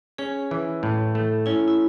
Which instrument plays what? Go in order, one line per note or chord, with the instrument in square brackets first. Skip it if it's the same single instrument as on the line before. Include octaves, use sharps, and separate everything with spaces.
[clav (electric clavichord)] C#4 [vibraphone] G#4
[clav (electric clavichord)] E3
A2
A3
[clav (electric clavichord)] C#4 [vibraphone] E4
[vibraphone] E4